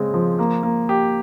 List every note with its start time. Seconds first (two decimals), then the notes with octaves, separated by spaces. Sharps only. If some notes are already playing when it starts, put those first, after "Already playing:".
Already playing: C#3 G#3 C4
0.14 F3
0.39 A#3
0.63 A#3
0.89 G4